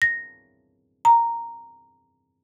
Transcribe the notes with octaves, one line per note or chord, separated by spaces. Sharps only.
A#6
A#5